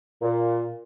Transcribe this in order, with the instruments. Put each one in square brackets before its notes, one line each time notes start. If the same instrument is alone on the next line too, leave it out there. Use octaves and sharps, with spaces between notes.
[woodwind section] A#2